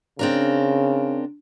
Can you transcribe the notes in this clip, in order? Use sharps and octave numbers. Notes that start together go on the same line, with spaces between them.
C#3 C4 D4 A#4